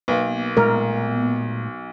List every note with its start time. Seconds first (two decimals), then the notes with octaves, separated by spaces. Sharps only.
0.08 B1 A#3 B3
0.57 A#2 G#3 A3 A#4